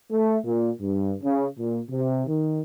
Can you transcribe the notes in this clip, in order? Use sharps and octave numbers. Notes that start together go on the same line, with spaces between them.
A3
A#2
G2
C#3
A#2
C3
D#3